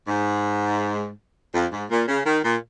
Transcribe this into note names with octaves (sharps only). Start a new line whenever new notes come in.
G#2
F2
G#2
A#2
C#3
D#3
A#2